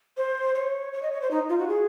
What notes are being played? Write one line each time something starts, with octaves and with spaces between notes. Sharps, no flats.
C5
C#5
C#5
D#5
C#5
C5
D#4
F4
F#4
G#4